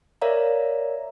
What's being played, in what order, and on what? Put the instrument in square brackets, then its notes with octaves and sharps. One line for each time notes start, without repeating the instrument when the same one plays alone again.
[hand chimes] A#4 C#5 D5 E5 F5 A#5